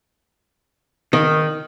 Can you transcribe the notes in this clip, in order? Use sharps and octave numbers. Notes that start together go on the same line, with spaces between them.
D#3